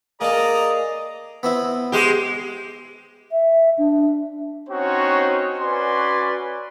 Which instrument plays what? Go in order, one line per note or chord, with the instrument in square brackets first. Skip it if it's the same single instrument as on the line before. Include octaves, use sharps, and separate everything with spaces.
[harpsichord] A#3 A4 [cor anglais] G#4 [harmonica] D5 A#5 [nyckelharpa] D#5
[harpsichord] B3 C4 E4
[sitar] G#3 G4
[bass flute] E5
D4
[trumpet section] C4 C#4 D#4 F#4 C5 C#5
C#4 F#4 B4 D5 G#5 C6